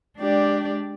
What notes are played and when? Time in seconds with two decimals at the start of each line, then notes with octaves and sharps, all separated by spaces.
0.18 G#3 D4 G4 D5 G5